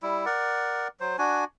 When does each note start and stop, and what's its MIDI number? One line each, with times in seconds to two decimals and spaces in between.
0.03 0.25 55
0.03 0.25 64
0.26 0.88 70
0.26 0.88 74
0.26 0.88 78
1.00 1.17 54
1.00 1.17 72
1.18 1.44 62
1.18 1.44 66
1.18 1.44 80